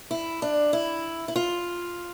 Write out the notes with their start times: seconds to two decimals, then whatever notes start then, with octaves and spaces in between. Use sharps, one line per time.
0.11 E4
0.42 D4
0.73 E4
1.28 E4
1.36 F4